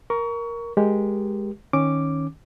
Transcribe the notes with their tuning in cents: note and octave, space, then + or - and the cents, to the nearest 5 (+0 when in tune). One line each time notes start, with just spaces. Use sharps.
A#4 +5 C#6 +25
G#3 +0 G4 +0 A#4 +20
D#3 +0 C#4 -10 D6 +0